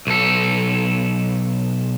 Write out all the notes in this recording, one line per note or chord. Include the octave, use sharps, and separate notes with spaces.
B1 A4